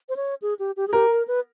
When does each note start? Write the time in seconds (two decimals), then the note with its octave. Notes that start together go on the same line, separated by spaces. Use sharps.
0.09 C5
0.16 C#5
0.42 G#4
0.59 G4
0.77 G4
0.88 G#4
0.93 G4 A#4
1.11 A#4
1.28 B4